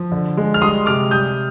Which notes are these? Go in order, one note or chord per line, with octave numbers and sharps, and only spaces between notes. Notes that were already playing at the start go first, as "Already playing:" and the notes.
Already playing: F3
D3
G#3
F6
G3 C6 D#6
C3 D6 F6
G3 D#6 G6